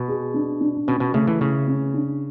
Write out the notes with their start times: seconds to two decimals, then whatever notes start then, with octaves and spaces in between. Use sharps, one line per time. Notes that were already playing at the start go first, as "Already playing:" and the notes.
Already playing: B2
0.08 G#4
0.34 D4
0.60 D4
0.87 B2 C#4
1.00 B2
1.14 C#3 A3
1.27 E3
1.41 C#3 E4
1.67 C#4
1.94 D4